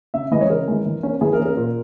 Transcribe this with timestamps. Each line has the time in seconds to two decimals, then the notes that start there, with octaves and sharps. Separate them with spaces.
0.14 C#3 E5
0.31 E3 G#3 D#5
0.41 C#5
0.50 C#3 A#4
0.68 E3 G#3
0.86 E3
1.03 A#3 C#4
1.21 E3 G#4
1.33 A#4
1.39 A#3 C#4
1.45 A#4
1.57 A#2